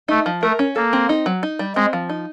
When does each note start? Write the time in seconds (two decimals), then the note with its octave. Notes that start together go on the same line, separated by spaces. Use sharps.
0.08 A3 D#4
0.26 F3
0.42 A3 A#4
0.59 C#4
0.76 A#3 A4
0.93 C4
1.09 D#4
1.26 F#3
1.43 D#4
1.59 G3
1.76 G#3 C4
1.93 F3
2.09 D#4